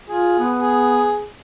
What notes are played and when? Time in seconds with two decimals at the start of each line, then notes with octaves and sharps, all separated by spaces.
0.09 F4 G#4
0.39 B3
0.61 G#4